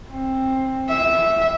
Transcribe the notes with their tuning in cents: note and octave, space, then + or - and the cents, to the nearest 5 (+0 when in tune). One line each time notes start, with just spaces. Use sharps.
C4 +15
E5 -10